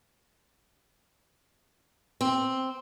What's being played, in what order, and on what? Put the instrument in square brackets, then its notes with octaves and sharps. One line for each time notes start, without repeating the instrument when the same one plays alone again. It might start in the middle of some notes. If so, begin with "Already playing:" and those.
[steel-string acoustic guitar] C4